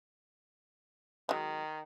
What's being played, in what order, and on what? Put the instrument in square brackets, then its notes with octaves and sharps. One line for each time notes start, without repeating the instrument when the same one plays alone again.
[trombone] D#3 [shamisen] F#3 G#3